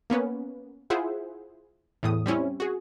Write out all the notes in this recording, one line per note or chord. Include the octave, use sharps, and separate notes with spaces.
A#3 B3 C#4 B4
E4 F4 G#4 C5 E5 F#5
E2 A2 D#6
G3 C4 C#4 E4
F#4 G#4